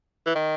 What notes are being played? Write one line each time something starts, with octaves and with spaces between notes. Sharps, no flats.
E3
D#3